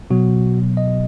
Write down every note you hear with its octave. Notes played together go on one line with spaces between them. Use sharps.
B2 F#3 B3 F#4
D#5